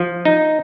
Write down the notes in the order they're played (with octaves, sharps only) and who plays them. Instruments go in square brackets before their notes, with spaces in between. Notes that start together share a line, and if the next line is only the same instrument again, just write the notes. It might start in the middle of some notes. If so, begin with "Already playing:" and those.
Already playing: [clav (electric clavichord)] F3
D#4